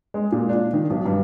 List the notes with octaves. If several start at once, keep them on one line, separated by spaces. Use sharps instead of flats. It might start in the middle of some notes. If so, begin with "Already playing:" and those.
G#3
A#2
D4
D#3
B1
G2